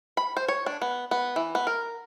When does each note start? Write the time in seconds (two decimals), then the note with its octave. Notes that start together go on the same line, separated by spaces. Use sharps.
0.17 B5
0.37 C5
0.48 C#5
0.66 D4
0.82 B3
1.11 B3
1.36 E3
1.55 B3
1.67 A#4